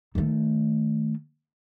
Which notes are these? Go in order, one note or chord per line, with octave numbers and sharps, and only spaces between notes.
D#3 A3